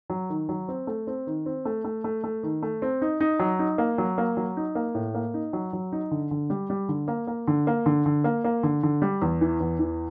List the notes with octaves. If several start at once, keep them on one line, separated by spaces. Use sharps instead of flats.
F#3
D#3
F#3
C4
A3
C4
D#3
C4
A3
A3
A3
A3
D#3
A3
C4
D#4
D#4
F#3
D#4
A#3
F#3
A#3
F#3
D#4
A#3
A2
A#3
D#4
F#3
F#3
D#4
D3
D3
G3
G3
D3
A#3
A#3
D3
A#3
D3
D3
A#3
A#3
D3
D3
G3
E2
E3
E2
E3